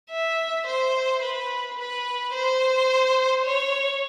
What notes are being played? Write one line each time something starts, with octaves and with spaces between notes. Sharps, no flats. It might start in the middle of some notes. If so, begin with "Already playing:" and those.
E5
C5
B4
B4
C5
C#5